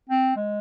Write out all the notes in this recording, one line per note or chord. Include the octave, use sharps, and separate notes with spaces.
C4
G#3